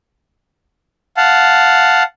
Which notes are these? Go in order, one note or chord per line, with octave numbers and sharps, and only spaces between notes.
F5 F#5 A5